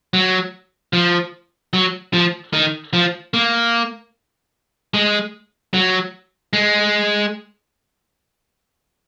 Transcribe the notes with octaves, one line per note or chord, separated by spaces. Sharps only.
F#3
F3
F#3
F3
D#3
F3
A#3
G#3
F#3
G#3